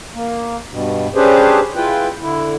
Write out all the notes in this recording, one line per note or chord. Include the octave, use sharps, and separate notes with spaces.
A#3
G2 B2
C#4 D4 G4 G#4 B4 C5
G#3 E4 F4 B4 G5
D3 E4